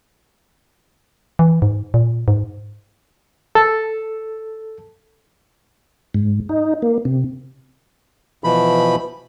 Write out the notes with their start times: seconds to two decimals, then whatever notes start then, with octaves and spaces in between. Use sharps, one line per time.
1.39 E3
1.62 G#2
1.94 A#2
2.28 G#2
3.55 A4
6.14 G#2
6.49 D#4
6.82 A#3
7.05 C3
8.44 B2 E3 F3 B5